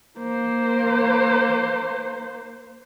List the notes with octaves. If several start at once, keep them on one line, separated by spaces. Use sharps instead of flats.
A#3 C5